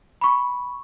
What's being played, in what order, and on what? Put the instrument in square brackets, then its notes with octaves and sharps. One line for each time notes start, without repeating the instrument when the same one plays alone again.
[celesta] B5 C#6